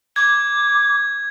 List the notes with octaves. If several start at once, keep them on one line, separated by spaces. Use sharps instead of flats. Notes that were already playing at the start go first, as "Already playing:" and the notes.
D6 G#6